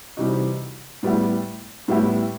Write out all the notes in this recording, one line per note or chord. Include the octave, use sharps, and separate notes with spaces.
C3 E3 G3 D#4 F#4
A2 G3 B3 E4 G4
A2 G3 B3 E4 G4